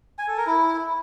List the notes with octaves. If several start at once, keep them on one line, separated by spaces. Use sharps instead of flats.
G#5
A4
A#4
E4